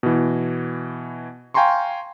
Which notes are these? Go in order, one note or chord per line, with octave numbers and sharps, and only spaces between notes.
B2 E3
F5 G5 G#5 A#5 C6 C#6